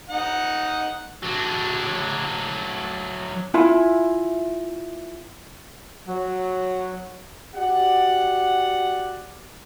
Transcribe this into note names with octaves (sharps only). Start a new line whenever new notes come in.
D#4 F#5
F#3 D4
E4 F4 E5 G#5
F#3
F#4 G4 D5 F#5